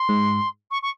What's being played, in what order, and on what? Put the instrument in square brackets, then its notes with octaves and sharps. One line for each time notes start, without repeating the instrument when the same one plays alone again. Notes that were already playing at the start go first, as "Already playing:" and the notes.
Already playing: [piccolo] C6
[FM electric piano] G#2
[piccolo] C#6
C#6